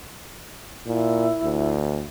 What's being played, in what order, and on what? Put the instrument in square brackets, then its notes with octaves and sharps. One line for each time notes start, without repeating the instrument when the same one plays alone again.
[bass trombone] A#2 [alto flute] E4
[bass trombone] D2